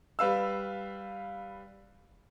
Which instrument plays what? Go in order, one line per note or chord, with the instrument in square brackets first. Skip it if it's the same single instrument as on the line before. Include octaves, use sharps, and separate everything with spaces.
[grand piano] G3 B4 F5 E6